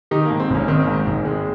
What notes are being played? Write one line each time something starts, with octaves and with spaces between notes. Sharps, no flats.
D#3 D#4 G4
G#2 A#3
C4
G#1 A#3 C#4
D#3 C4
G#2
G#1
G#3